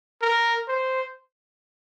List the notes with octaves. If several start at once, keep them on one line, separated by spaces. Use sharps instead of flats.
A#4
C5